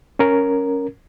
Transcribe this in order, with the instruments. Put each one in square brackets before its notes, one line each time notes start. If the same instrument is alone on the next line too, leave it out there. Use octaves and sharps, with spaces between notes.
[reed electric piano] C#4 A#4